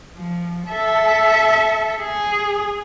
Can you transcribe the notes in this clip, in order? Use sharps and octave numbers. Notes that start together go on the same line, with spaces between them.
F3
A4 E5
G#4